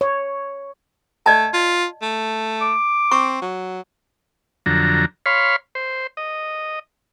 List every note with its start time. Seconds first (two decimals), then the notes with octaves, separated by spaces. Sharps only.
0.01 C#5
1.26 A3 D5 D#5 A5
1.53 F4
2.02 A3
2.61 D6
3.12 C4 C#6
3.41 F#3
4.66 F2 D3 F#3 A#5
5.26 C#5 F5 B5 C6
5.75 C5
6.17 D#5